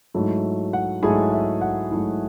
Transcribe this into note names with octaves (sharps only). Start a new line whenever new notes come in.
G#2 F#3 A3 E4
F#5
G#2 F#3 A3 E4 G#4 G#5
E5
F#5
G#2 F#3 A3 E4